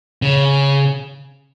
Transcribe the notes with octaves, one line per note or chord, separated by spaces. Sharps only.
C#3